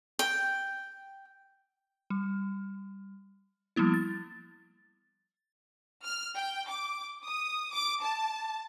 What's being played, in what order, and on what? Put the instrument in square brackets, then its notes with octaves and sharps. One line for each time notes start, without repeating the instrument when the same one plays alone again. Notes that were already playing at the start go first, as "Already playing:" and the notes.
[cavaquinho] G5
[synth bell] G3
F3 G3 A#3 B3 E4
A6
[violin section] F6
G5
D6
D#6
D6
A5